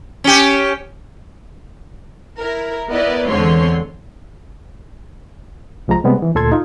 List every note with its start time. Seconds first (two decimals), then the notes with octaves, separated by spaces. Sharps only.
0.24 C#4 G4
2.38 E4 A#4
2.90 B3 E4 A#4 B4 D5 D#5
3.29 E2 D3 G#3 C4 C#5 C6
5.88 C2 F3 G#3 A#5
6.04 C3 G3 G#3 B3
6.22 E3
6.35 D2 A#2 A4 C6 G#6
6.52 D#4 F4